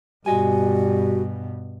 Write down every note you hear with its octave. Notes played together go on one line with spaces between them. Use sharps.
G2 B2 G3 F#4 D#5 G#5